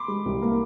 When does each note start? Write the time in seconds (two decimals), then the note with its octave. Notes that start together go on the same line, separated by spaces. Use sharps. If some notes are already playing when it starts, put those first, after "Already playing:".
Already playing: B5 C6 D6
0.08 G#3
0.26 C2
0.42 A#3